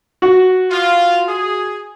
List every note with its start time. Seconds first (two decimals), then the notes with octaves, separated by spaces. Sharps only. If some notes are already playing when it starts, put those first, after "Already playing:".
0.22 F#4
0.71 F4
1.28 G#4